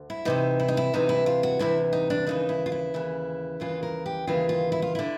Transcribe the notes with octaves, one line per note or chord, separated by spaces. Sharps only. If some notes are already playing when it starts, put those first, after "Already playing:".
Already playing: D2
E4
D2 C3 E3 D#4
E4
D#4
E4
D2 C3 E3 D#4
E4
F4
F#4
D2 C3 E3 E4
D#4
D4
D#2 C#3 E3 D#4
E4
F4
E4
D#2 C#3 E3
D#2 C#3 E3 F4
A#4
G4
D#2 C#3 E3 F4
F4
E4
F4
D3 E4